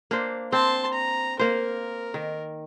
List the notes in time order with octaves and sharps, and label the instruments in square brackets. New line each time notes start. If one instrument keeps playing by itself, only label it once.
[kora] A#3 D4 C5
[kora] C4 [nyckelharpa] A5 C6
[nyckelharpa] A#5
[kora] A#3 C5 [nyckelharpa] A#4
[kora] D#3